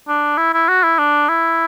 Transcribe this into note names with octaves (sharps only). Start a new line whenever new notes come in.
D4
E4
E4
F#4
E4
D4
E4